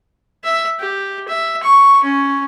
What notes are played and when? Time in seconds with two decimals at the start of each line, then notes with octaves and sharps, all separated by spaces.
0.44 E5
0.79 G4
1.28 E5
1.63 C#6
2.03 C#4